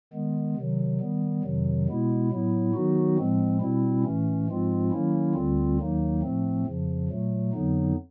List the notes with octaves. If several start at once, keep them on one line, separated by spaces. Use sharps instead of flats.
D#3 G#3 B3
C3 D#3 F#3
D#3 G3 B3
F2 C3 D#3 F#3
B2 G#3 B3 E4
A2 F#3 B3 E4
D#3 F#3 B3 D#4 F#4
A2 F3 G#3 C4
B2 G3 C4 E4
A2 E3 A3 C#4
G#2 F3 G#3 C4 F4
D#3 F#3 A#3 C#4 E4
D2 D3 G3 C4 F4
D#2 D#3 F#3 A#3 D#4
A2 F3 A3 C4
F2 C#3 F3
A#2 F#3 A3
F2 D3 F#3 B3 D#4